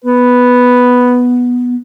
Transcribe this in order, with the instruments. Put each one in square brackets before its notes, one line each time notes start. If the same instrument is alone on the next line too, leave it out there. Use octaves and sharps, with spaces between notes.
[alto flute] B3 [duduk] B4